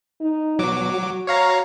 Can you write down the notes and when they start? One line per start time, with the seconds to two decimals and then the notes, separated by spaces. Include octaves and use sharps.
0.21 D#4
0.59 B2 F#3 D6
0.92 F#4
1.27 C#5 F5 A#5